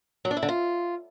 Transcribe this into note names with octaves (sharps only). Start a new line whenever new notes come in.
F#3
D4
E4
D3
F4